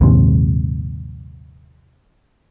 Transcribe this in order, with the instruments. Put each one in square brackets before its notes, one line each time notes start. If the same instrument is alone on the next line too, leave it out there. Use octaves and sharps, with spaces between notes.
[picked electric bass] A#1 D#2 G#2 C3